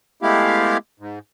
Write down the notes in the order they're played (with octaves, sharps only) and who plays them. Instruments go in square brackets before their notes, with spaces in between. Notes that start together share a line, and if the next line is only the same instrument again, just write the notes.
[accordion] G#3 A3 B3 E4 G4 F5
G#2